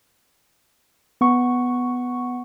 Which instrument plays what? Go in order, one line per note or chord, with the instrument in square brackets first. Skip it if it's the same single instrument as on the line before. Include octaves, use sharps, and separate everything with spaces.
[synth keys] B3 F#5 C#6